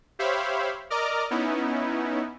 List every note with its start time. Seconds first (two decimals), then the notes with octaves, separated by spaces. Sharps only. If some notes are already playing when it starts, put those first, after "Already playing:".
0.19 G4 C5 C#5 E5 F5 B5
0.90 A#4 D5 D#5 A#5 D6 F6
1.31 B3 C#4 D#4 E4